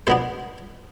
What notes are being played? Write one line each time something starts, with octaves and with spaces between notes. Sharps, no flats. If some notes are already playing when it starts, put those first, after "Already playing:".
B2 B3 D4 C5